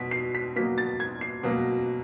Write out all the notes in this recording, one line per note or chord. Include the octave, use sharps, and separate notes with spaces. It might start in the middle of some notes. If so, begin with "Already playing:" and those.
Already playing: B2 F#3 B6
C7
B6
B2 F#3 A#3 B6
A6
G#6
C7
B2 F#3 A#3